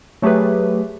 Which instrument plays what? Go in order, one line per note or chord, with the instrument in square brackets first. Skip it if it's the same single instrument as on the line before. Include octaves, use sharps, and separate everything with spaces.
[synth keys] F#3 A3 G4 G#4 B4